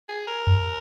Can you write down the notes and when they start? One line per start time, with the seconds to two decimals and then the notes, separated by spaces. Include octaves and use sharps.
0.09 G#4
0.27 A#4
0.47 F#2